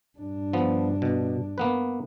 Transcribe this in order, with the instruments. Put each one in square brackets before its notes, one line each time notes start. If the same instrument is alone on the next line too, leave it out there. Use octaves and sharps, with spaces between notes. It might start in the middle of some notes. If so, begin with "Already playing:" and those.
[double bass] G2 D4
[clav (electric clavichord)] F3 B3
B2
A#3 B3 B4